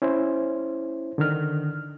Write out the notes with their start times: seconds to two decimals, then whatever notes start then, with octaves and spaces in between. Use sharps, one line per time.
0.02 C#4 E4 C5
1.18 D3 D#3 F6